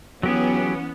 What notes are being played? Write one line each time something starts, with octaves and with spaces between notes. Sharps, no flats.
E3 F#3 B3 C#4 G4 G#4